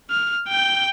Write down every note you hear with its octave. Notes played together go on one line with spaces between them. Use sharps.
F6
G5 G6